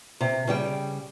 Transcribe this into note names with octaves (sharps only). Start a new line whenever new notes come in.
C3
C#3 G3 G5